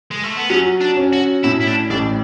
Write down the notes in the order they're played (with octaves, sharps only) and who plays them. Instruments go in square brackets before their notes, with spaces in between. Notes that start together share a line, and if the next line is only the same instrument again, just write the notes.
[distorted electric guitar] G#3
A3
B3
[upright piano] F#3 [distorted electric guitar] C#4
[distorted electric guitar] D4
[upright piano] C#4
[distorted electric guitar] F#4
[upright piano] A2 [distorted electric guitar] E4
[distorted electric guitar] E4
D4
[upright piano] A1 [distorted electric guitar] D4